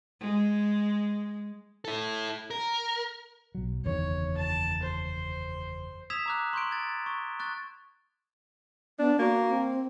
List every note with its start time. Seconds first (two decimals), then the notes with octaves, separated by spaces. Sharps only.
0.20 G#3
1.85 E4 A4
2.51 A#4
3.55 B1 F#3
3.84 F#1 E2 D#3 C#5
4.37 A5
4.82 C5
6.10 D#6 E6 G#6 B6 E7 F7
6.26 A#5 D6 F#6
6.53 C6 C#6 G6 D7
6.71 G#6 A6
7.06 C#6
7.39 C#6 F#6 A6
8.99 B3 D4
9.19 A#3 F#4
9.49 C4